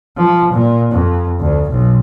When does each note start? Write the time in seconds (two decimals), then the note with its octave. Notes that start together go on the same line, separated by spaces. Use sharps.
0.17 F3
0.53 A#2
0.92 F2
1.40 D2
1.71 B1